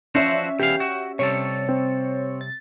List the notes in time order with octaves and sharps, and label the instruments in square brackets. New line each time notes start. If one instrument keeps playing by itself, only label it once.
[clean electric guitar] F3 F#4 C5 [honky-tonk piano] C#4 D5 E5
[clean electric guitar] E2 E3 F5 [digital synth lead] G4
[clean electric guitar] F#4
[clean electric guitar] C3 G3 A4 [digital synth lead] C#5
[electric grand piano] C4
[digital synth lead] A6